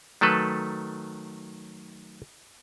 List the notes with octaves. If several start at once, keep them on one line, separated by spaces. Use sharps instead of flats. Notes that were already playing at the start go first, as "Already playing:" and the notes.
D#3 F#3 A3 A4 B4